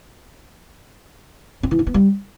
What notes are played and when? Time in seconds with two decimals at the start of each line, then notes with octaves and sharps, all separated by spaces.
1.63 C4
1.71 E3
1.79 D#4
1.87 B3
1.94 G3